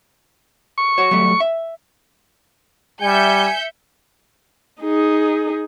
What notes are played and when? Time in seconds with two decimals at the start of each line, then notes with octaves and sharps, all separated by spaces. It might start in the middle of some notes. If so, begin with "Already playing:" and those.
0.78 C#6
0.98 F#4 C#5
1.11 F#3 G3 A3
1.40 E5
3.02 G3 E5 G#5 G6 C#7
4.82 D#4 G#4